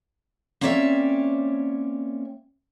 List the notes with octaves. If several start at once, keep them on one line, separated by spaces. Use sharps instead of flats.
A#3 C4 C#4 C#5 D5 E5